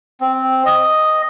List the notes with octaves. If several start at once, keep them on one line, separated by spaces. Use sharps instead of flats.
C4
D#5